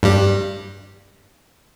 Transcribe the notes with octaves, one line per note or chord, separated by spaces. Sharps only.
G2 G3